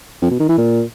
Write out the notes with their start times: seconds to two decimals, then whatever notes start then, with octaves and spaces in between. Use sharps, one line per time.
0.22 F2
0.31 B2
0.40 D#3
0.49 E3
0.58 A#2